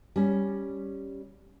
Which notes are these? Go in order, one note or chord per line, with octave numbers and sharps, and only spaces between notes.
G3 C#4